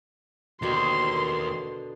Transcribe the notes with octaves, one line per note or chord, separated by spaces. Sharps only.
D#2 B2 D3 C6